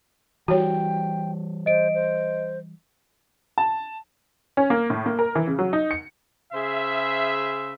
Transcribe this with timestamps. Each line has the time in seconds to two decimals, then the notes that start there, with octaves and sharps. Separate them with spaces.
0.48 E3 G3 F#4 C#5 G5
1.66 C5 D#5 D7
1.94 C5
3.58 A5
4.57 C#4
4.70 A#3
4.90 A2
5.06 A#3
5.19 A#4
5.35 E3
5.47 C#3
5.59 F#3
5.73 D#4
5.91 C#7
6.53 C#3 G#4 C5 E5